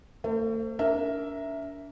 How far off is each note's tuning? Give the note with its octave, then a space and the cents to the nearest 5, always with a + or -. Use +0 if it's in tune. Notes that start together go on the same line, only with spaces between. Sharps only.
A3 +40 C5 +0
D4 -40 A#4 +0 E5 +0